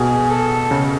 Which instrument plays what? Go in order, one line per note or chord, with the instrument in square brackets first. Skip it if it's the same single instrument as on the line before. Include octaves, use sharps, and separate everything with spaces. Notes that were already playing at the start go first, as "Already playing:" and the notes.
Already playing: [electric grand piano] B2 [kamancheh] G#4
[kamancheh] A4
[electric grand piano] C#3